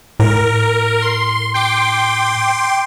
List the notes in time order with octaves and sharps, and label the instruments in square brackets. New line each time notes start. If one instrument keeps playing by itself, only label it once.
[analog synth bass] A2 [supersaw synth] A#4
[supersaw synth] C6
G5 C6 D6